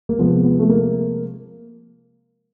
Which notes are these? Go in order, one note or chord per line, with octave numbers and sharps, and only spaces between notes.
A#3
C3 F3 G#3 B3
B3
A3
A#3